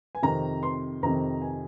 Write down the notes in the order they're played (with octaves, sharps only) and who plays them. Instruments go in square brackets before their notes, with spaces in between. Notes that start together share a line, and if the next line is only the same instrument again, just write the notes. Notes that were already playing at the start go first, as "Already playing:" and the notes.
[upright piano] G#5
F2 C3 D#3 A#5
C6
F2 C3 D#3 A#5
G#5